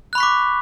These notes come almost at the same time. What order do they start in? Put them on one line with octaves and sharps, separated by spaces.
F#6 B5 C#6 B6 D6